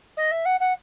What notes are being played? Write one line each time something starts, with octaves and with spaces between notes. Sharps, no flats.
D#5
E5
F#5
F#5